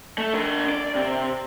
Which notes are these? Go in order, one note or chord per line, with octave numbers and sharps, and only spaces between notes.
A3
D4 A#4
D5
C3